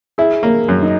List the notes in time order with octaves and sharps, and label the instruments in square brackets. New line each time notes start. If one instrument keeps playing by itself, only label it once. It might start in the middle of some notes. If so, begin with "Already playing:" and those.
[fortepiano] E4 [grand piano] G#4
[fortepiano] A#3
F#2
[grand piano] D#4